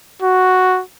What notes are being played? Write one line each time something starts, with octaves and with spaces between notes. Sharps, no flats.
F#4